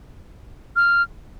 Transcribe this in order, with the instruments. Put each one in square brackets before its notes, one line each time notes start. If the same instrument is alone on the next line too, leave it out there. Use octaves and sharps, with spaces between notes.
[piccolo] F6